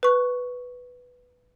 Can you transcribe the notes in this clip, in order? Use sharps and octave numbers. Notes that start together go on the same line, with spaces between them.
B4 C#6 F#6